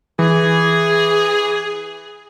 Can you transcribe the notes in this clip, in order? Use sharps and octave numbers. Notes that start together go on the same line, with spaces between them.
E3 G#4